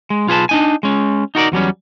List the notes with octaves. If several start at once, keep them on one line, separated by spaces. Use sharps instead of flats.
G#3
B1 F4 G#4 B4 A5
D4 D#4 G#5
G#3 C#4
D#4 F#4 A#4 D5
E2 F#3 G3 C#4